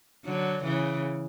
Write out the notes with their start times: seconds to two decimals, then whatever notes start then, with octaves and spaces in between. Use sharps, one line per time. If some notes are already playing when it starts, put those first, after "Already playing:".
0.25 D3 F#3
0.63 C#3 E3